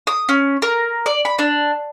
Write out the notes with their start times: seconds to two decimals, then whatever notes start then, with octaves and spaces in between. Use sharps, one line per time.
0.07 D#6
0.29 C#4
0.62 A#4
1.06 D5
1.25 B5
1.39 D4